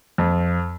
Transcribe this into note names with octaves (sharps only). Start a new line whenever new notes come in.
F2